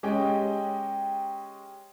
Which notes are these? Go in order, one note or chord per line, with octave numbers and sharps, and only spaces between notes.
G#3 C#4 G4 D#5 G5